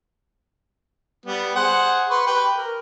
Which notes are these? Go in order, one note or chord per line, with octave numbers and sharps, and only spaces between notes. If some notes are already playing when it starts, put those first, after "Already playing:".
G3 B3
G#4 C5 F#5
B4 C6 C#6
G4 B4 G5
A#4